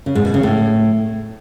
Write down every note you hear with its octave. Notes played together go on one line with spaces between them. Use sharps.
C#3
G#2
B2
C#3
A2